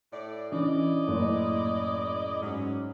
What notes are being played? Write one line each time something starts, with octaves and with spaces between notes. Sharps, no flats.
A2 D5
E3 C#4 D4 E4 D5 D#5
F#1 A2
G#2 F#3 C#4